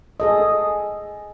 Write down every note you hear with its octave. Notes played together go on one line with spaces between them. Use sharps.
G#4 A4 D#5